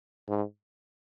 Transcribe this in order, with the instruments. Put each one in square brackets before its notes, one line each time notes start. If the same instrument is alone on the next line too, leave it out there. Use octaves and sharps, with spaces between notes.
[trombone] G#2